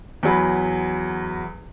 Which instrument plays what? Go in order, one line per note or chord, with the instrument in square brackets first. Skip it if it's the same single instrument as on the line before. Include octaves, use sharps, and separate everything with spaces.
[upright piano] E2 F#3 B5